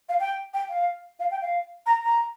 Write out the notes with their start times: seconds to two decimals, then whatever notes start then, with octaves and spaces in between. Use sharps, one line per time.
0.09 F5
0.20 G5
0.54 G5
0.70 F5
1.20 F5
1.31 G5
1.42 F5
1.86 A#5
2.03 A#5